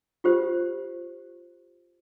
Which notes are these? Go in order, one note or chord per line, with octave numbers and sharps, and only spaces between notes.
F4 G4 C5